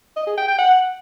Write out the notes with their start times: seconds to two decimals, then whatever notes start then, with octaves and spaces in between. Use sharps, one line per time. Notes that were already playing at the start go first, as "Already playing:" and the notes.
0.16 D#5
0.27 G#4
0.37 G5
0.48 G5
0.59 F#5